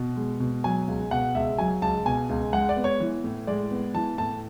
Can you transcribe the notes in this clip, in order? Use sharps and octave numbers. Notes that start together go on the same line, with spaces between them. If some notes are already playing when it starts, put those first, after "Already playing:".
Already playing: B2 B3
G#3
B2
F#3 G#5
C#2
B2 F#5
C#2 E5
F#3 G#5
C#2 A5
B2 G#5
C#2
G#3 F#5
D5
B3
C#5
E3
A2
G#3 D5
B3
E3 A5
A2 A5